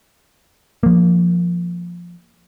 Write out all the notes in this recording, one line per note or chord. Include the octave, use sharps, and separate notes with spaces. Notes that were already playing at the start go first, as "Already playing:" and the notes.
F3 A#3